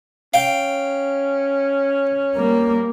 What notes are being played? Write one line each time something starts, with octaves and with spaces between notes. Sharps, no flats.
C#4 F5 G5
G3 A#3